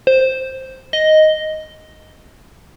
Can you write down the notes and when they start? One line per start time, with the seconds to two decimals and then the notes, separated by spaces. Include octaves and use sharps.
0.07 C5
0.93 D#5